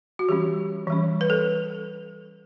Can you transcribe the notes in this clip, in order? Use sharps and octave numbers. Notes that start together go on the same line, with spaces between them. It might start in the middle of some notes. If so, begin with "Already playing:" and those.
F#4
E3 G3 C#4 G4
E3 G3 C#4
B4
A4